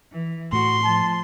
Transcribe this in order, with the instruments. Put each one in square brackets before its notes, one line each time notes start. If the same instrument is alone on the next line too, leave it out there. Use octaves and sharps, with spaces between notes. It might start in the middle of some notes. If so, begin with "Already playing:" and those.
[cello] E3
[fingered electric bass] A2 [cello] F#4 [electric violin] C6
[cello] F3 [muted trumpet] A5